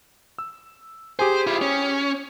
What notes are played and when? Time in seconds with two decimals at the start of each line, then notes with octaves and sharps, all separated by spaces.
0.39 E6
1.19 G4 G#4 C5 G#5
1.47 E4 F4
1.61 C#4